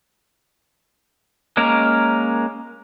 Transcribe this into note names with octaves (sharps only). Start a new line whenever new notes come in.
G#3 A#3 C#4 A#4